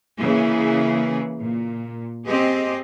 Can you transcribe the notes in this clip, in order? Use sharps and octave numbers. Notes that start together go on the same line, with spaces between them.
C#3 E3 A#3 G#4
A#2
C4 G4 G#4 D#5